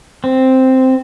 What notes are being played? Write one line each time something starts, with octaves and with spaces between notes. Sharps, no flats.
C4